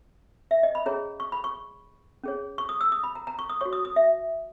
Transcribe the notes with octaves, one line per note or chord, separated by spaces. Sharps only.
E5
D#5
B5
C#4 G#4 C#5 A#5
C#6
B5
C#6
C#4 G#4 C#5
C#6
D#6
E6
D#6
B5
A#5
A#5
C#6
D#6
F#4 C#5 C#6
D#6
D#6
E5